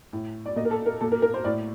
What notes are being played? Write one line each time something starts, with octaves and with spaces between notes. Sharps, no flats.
A2
D5
A#2 D#5
A#4
A4
A#4
A#2 A4
A#4
A#4
C5
A2 D5